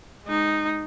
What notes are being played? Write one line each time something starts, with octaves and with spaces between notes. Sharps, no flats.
G#3 D#4